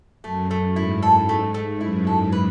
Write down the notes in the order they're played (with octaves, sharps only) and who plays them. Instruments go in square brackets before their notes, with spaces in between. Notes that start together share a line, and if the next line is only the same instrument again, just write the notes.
[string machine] F#2 [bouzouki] A3
[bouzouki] A3
[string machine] G#2 [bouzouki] E4
[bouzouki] A4
[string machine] G#2 [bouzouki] A3
[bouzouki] A3
[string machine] F#2 [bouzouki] E4
[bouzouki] A4
B4